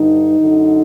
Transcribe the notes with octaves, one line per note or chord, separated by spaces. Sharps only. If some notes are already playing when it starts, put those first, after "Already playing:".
Already playing: G2 D3 D#4
F#2 D3